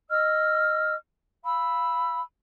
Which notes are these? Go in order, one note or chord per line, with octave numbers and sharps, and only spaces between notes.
D#5 E6 F6
F5 B5 E6